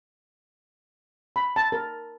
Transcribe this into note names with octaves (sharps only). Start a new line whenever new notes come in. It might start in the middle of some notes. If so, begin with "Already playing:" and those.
B5
A5
A#4